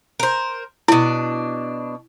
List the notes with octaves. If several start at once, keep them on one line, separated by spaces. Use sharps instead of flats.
A#4 C5
B2 D4 E4